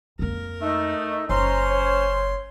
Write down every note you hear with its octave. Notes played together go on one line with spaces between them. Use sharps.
F2 A#3 A#4
A3 D#4
F#1 C#4 C5 A#5 C6
C#5